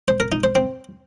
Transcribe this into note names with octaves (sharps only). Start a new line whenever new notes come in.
C5
A#4
D#4
C5
C4